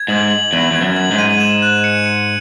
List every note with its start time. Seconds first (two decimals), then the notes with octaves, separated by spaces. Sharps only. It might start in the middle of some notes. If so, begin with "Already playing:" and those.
Already playing: G#6
0.08 G#2 F#7
0.30 F#7
0.53 E2 F#7
0.71 E2 G#6
0.82 F#2
0.97 F#7
1.11 G#2
1.18 D#7
1.40 E7
1.62 F#6
1.84 C#7
2.06 C#7